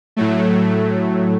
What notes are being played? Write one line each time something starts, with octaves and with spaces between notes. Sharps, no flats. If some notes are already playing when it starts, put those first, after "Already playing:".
A2 F#3 A3